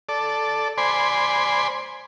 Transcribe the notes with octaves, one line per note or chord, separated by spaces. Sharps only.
A4 D5
C5 D5 G#5 B5 C6